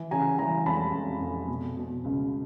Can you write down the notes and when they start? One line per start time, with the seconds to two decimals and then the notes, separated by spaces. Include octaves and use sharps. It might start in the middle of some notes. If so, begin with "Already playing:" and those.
Already playing: E3
0.11 C#3 G#5 A#5
0.38 E3 G#5 A#5
0.66 F2 A5 B5
0.94 F2
1.21 F2
1.48 B2
1.77 B2
2.04 C#2